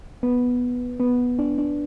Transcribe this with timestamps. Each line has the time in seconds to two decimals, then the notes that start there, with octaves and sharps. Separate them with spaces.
0.23 B3
1.00 B3
1.39 D4
1.58 D4